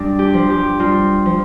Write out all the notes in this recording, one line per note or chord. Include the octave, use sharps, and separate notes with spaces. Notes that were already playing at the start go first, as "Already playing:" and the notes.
Already playing: G2 D4
G4
F3
G4
G2 F4
F3